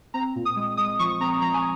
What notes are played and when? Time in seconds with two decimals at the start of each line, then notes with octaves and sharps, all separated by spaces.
0.14 C4 A#5
0.36 A#2
0.45 D#6
0.56 G#3
0.77 G#3 D#6
0.99 F3 C#6
1.20 C4 A#5
1.42 F3 A#5
1.54 G#5